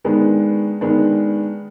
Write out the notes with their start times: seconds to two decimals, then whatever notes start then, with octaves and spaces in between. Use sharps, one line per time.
0.04 D#3 G#3 B3 D4
0.81 D#3 G#3 B3 D4